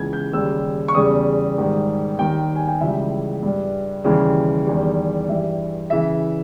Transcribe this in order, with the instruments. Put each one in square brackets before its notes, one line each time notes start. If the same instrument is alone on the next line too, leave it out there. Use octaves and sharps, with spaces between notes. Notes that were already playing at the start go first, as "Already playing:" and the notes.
Already playing: [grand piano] C#2 C#3 E3 G#6
G6
D#2 C#3 G3 E6
C#6
E2 C#3 G3 D#6
G#2 D#3 G3
D#2 D#3 G3 G5
G#5
G5
C#2 C#3 E3 G3 E5
G2 G3
D#2 C#3 E3 G3
E2 D#3 G3
G2 E3 G3 E5
C#3 E3 E5